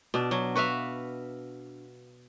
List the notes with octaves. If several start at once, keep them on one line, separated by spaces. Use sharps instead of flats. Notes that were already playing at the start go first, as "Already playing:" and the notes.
B2 D4
F#3
F#4 B4 E5 F5